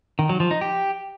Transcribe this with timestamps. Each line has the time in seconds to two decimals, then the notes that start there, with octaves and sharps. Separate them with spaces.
0.19 D#3
0.29 F#3
0.40 F3
0.51 D#4
0.61 G4